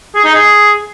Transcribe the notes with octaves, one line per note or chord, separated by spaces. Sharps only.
G#4
D#4
G#4